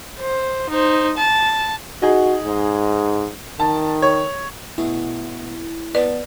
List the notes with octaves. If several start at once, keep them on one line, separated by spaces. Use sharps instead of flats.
C5
D#4 C5
A5
D#4 F#4 G#4
G#2
D#3 A5
C#5
B2 A3 E4 G#4
B3 B4 D5 A5